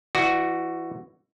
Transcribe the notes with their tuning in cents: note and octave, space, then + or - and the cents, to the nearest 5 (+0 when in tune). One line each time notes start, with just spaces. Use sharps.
E3 +20 F#4 +0 D5 +35